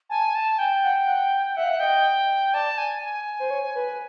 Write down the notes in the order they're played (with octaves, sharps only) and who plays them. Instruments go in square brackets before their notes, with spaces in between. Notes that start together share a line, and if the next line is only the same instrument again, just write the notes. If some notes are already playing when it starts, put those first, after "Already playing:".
[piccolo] G#5 [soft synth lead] A5
[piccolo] A5
[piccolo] G5 [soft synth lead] G#5
[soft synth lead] F#5
F#5
[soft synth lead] E5 [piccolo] F#5
[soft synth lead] F5
E5
[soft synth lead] D#5 [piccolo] G5
[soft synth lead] D5 [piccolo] A5
[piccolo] G#5
G#5
[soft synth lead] C5
C#5
B4